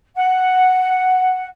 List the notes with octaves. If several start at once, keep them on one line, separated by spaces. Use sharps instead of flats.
F#5